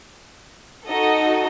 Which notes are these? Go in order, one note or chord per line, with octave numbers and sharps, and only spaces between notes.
D#4 F#4 A4 D#5